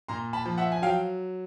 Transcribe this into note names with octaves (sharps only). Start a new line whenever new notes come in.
A#2 A#5 C6
A5 B5
F3
E5 F#5
G#5
F#3 F5 G5